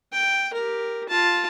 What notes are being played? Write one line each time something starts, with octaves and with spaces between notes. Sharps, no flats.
G5
G4 A#4
F4 A5